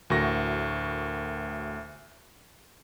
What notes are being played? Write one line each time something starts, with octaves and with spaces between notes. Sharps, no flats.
D2 A2 F#4 A#4 C#6 A#6